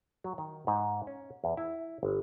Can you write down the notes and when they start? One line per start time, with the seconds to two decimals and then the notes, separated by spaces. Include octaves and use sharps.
0.24 F#3
0.38 D#3
0.67 G#2
1.07 C#4
1.44 E2
1.57 E4
2.03 G1